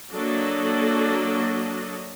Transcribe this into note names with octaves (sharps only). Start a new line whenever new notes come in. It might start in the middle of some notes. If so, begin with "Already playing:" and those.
F#3 A#3 D4 F#4 A4 D#5